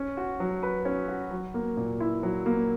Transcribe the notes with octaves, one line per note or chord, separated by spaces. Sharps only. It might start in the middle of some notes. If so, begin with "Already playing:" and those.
Already playing: C#4
F#4
F#3
B4
C#4
F#4
F#3
A#3
A#2
E4
F#3
A#3